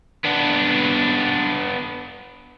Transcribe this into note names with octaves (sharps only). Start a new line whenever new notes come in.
B3 D4